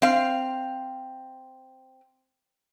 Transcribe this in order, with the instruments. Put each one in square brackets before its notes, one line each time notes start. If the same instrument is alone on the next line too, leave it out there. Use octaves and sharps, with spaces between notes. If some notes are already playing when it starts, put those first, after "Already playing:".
[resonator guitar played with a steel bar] C4 F5